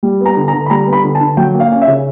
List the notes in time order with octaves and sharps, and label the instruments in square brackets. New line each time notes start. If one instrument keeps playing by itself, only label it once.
[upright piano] G3
B3 A#5
D3
A#5
D3
B5
G3 A#5
B3
B5
D3
A5
D3
F#3 G5
A#3
F5
C#4
E5
C#3